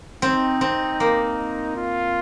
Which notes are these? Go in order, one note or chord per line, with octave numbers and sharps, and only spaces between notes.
C4 D#4
C4
A#3
F4